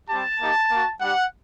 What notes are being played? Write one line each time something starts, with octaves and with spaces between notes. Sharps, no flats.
G3 C4 G4 A5
A#3 D#4 G4
A#3 F#4
G3 D4 G4 F#5